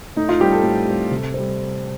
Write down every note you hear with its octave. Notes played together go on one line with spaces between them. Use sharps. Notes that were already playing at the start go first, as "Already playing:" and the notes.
A2 D#4
F4
G3 C4 G4
A4
A2
G3 C4
C3
G3 C4